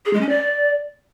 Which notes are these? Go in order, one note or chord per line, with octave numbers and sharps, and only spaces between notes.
G#4
G#3
C#4
D5